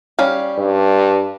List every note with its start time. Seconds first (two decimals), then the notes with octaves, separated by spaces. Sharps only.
0.19 G3 C#4 F5
0.58 G2